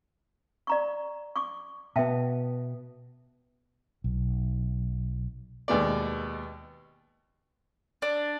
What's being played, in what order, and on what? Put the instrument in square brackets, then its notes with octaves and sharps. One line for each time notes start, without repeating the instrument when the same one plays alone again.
[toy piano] D5 A#5 C#6
C#6 D6
[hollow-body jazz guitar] B2 B3 [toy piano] E5 G5 A5
[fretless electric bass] B1
[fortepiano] D#2 B2 G#3 B3 D5
[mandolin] D4